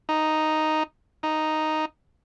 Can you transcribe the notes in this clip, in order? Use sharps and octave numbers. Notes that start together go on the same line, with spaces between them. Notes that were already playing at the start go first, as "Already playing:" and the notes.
D#4
D#4